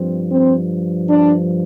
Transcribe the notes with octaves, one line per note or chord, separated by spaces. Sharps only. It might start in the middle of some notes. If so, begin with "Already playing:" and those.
Already playing: G2 F3 C4
C4
D4